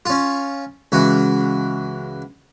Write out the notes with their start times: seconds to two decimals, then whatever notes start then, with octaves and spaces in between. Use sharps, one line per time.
0.06 C#4 F4
0.92 C#2 E3 F#4